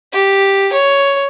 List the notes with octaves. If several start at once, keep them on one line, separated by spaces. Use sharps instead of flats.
G4
C#5